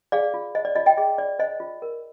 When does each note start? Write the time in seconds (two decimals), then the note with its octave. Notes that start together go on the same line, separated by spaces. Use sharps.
0.12 G#4 D5 F5
0.34 F4
0.55 C5 D#5
0.65 D5
0.76 F4 D#5
0.86 D#5 G5
0.97 G#4 D#5
1.18 F4 D5
1.39 C5 D#5
1.60 F4
1.82 A#4